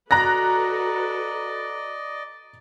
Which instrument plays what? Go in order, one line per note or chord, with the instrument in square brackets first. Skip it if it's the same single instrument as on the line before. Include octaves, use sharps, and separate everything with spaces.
[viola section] F#4 A4 B4 [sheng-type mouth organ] D5 D#5 [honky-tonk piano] A#5 F#6 A#6